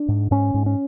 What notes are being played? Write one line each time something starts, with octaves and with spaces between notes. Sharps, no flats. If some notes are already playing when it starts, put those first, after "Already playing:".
Already playing: D4
G#2
G#2 C#4
G#2
C#4